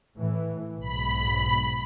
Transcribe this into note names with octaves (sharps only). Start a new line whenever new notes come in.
A2 E3
B1 G#2 B5